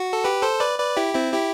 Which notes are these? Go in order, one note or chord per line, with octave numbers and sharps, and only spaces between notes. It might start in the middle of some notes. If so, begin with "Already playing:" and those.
Already playing: F#4
A4
G4 B4
A4 C5
B4 D5
B4 D5
E4 G4
C4 E4
E4 G4